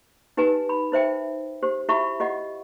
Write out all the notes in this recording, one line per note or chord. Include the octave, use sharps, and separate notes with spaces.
D#4 G4 B4 G#5
B5
D#4 C5 E5 G5
G4 C5
E4 F#4 G4 E5 B5 C#6
F4 G4 D#5 F#5